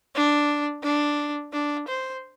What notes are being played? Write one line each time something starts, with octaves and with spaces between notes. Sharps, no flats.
D4
D4
D4
C5